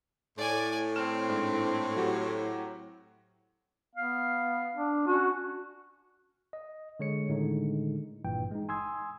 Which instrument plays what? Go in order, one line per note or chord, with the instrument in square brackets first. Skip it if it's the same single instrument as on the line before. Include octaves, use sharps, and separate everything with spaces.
[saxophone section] A2 [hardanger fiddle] D5 G#5
[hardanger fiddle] C4 [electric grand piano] A4 F6 E7
[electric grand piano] G#2 D4
F#3 F#4 G4
[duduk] B3 [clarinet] F5
[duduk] D4
[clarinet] C#4 [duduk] F#4
[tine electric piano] D#5
D3 G#3 C#5 C#7
A2 D3 D#3 G#3 D#4
G#1 G2 A#2 E3 G5
G#3 D#4
G#5 C6 D#6 E6 G#6